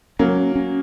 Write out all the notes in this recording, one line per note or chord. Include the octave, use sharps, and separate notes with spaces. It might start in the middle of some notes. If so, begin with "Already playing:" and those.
F#3 A#3 C#4
C#4